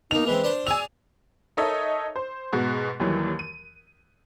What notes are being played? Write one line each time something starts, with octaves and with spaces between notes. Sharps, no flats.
B2 A#3 D#4 F7
E3 G#3 C4 B4
D4 C5 D5
F#4 G#4 D5 G#5 E6 F7
D#4 A4 A#4 C#5 D#5 E5
C5
G#2 B2 F#4
D#2 D#3 E3 F#3 G3
D#7